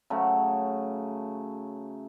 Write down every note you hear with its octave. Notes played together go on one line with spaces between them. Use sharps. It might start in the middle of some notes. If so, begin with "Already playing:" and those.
C#3 F#3 A3